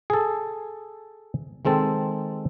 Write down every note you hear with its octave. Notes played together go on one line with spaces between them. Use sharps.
G#4 A4
D#3 G#3 C4 A4